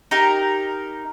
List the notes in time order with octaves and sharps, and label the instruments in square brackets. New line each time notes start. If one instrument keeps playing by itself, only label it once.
[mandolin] D#4 G4 A#4